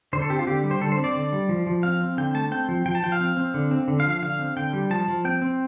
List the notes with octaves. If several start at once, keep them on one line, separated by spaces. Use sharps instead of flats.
D3 C5
A4
C4 G4
F4
D3 G4
G3
C5
D3 A4
C5
C4
D5
D3
G3
F3
F3
C4 F5
C4
D3 G5
A3 A5
C4 G5
F3
F3 G5
A5
F3 G5
F5
C4
C4
D3
C4
D3
F5
F3
F5
D3 F5
C4
D3 G5
G3
F3 A5
F3
C4 G5
C4